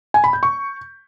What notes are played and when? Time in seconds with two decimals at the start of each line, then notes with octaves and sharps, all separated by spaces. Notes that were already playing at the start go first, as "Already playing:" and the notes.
0.14 G#5
0.24 B5
0.33 G6
0.43 C#6